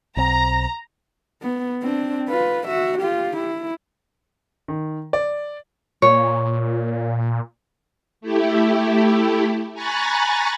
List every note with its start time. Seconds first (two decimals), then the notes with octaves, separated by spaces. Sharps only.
0.17 B1 C4 A#5
1.42 B3
1.82 C4 D4
2.29 F4 B4
2.67 F#4 E5
2.99 F4 G4
3.37 E4
4.68 D#3
5.13 D5
6.02 A#2 C#5
8.21 A3 E4 G4
9.74 G#5 A#5 B5 C#6 F#6 A6